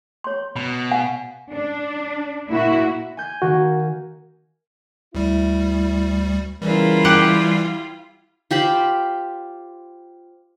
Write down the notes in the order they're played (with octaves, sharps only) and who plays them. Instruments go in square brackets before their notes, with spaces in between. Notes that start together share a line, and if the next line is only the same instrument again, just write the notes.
[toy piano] C#5 C6
[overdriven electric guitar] B2 [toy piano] B5
[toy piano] F5 F#5 G#5
[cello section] D4
A#2 A#3 E4 F#4 E5
[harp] G#5 G6 G#6
[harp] D#3 A#3 [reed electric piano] F#4
[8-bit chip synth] D2 G3 [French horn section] E4
[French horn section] C#3 B3 A#4 [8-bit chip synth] E3 G3 [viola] E4 F4
[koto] G4 F#5
[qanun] F4 G4 C5 B5